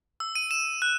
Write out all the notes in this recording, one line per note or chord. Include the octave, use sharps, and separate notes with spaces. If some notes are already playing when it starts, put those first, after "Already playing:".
E6
D#7
E7
F#6